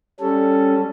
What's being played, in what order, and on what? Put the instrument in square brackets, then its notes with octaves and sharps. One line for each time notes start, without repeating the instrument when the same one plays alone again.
[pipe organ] G3 C#4 A4